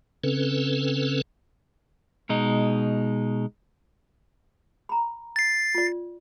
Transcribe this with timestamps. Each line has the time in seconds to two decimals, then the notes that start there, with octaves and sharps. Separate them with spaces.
0.24 C#3 C4 C#4 A4 B4
2.29 B2 G#3 D#4
4.89 A#5 B5
5.36 A6 C7
5.75 F4 D5